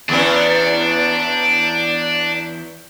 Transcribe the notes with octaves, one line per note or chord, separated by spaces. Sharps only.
E2 B3 C#4 D4